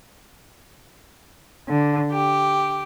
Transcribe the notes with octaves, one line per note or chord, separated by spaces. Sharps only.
D3
G4